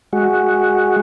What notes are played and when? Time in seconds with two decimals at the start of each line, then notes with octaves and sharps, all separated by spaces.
0.13 G#3 F#4